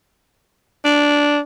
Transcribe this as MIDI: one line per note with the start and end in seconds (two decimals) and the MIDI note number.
0.85 1.40 62